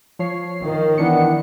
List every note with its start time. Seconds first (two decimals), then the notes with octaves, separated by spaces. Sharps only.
0.19 F3 C#5 C7
0.64 D#3
0.98 E3 B3 D4 C#7